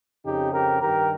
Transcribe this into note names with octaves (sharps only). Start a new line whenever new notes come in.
F2 C#3 D#4 G4
G4 A#4
G2 D#3 G4 A#4